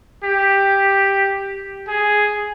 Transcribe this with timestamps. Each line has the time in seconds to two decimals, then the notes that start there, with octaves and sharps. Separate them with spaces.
0.24 G4
1.88 G#4